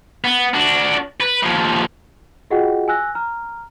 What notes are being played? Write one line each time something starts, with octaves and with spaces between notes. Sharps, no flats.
B3
D4 F#4
B4
D#2 F3
F4 F#4 G#4 D#5 F#5 G5
G#5 E6 F#6 A#6
A#5 F6